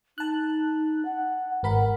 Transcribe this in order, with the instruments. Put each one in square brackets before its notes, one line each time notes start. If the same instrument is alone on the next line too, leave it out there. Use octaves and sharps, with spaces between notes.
[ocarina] D#4 [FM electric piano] A5 F#6
[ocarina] F#5
[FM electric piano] G#1 A#4 B5 [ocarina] F#5